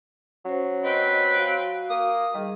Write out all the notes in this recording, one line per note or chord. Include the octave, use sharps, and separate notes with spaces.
F#3 C#4 C5
C4 B4 D#5
F#4 F5
A#3 D#6
D#3 G3 G#4